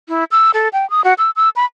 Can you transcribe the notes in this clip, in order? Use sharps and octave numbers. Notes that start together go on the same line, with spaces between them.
E4
E6
A4
G5
D#6
F#4
E6
E6
B5